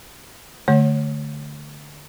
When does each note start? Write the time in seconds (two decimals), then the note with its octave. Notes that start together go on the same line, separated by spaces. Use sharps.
0.68 D3 A3 C#5